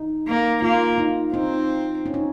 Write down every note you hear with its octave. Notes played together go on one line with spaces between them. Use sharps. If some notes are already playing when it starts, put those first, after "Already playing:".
Already playing: D#4
A#3
A#3 F4
D#4
C4 D#4
C#4
D#4